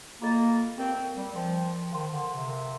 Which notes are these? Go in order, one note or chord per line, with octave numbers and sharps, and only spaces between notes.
A#3 F4 A4 D#5
C4 G4 A#4 D5 F5
G3
F3 A#4 D#5 G5 C6
F3
D#3 A#4 F5 A5 C6
D3
C3
A#4 F5 C6